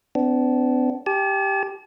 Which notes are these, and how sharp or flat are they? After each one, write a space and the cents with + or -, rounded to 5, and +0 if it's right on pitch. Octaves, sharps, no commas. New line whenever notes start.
B3 +45 D4 -20
G4 +0 A5 -45